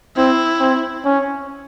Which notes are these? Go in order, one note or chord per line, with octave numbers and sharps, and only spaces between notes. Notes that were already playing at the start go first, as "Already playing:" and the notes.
C4 E4
C4
C#4